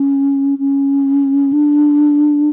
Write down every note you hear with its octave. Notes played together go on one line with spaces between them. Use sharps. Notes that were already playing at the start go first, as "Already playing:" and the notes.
Already playing: C#4
C#4
D4